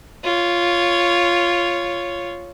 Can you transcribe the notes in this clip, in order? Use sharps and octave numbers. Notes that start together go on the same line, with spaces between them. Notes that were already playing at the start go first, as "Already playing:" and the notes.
F4 C#5